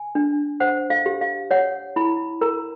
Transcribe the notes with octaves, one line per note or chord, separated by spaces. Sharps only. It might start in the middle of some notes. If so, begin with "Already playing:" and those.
Already playing: G#5
D4
C5 F#5
F5
G4
F5
C#5 F#5
E4 B5
A#4 A#5